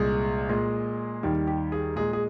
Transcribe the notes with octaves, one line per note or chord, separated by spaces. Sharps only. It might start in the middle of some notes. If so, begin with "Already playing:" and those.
Already playing: C2 A#2 G#3 G#4
A#2 G#3
D#2 D#3 G3
G4
G#4
A#2 G#3 G#4
G#4